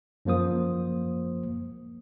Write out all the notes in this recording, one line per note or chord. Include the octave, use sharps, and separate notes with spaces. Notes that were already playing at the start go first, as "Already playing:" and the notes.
F#2 F3 A#3 C5 D#6